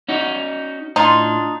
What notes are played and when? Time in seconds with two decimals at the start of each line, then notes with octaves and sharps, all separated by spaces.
0.08 C#4 D#4 F#4
0.96 A2 D4 D#4 F4